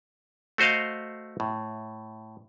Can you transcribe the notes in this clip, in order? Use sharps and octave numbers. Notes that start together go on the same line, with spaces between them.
A3 F#4 C5 D#5 F5
A2